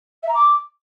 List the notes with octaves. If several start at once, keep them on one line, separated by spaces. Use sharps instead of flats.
E5
A#5
D6